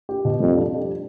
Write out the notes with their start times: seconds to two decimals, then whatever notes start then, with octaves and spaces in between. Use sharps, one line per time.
0.09 G4
0.25 B2
0.40 F2 G3
0.56 D4
0.71 G4